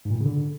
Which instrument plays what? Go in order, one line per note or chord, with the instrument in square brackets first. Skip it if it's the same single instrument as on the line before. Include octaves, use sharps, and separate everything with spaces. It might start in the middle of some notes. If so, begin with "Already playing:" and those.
[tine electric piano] G#2
A#2
A2
C#3
D3